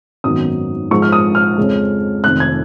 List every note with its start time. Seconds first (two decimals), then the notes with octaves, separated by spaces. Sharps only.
0.24 G#1 F#2 D#3 F#3 B3 D#6
0.91 G#2 F3 G#3 C#6
1.02 F6
1.12 D#6
1.35 F6
1.57 F2 C#3 G#3 C#4
2.24 F1 F2 D#3 F#6
2.40 G#6